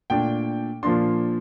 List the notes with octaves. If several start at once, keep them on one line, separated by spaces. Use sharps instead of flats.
A#2 A3 D4 G5
A#2 F3 A#3 D4 C6